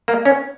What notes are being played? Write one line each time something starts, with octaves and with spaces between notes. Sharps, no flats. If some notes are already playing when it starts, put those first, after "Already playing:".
A#3
C#4